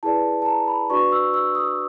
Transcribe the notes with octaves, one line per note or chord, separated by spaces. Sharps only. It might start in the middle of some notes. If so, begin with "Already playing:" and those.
E4 G#4 B4 D5 A5
A5
A#5
B5
D4 F#4 B4 D5 C#6
E6
E6
D#6